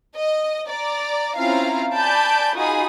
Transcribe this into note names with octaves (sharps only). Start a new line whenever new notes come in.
D#5
D5 A#5
C4 C#4 E4 F4 F5 A#5
D5 G#5 A5 B5 G6 D7
D#4 F4 F#4 G#4 B5 D#6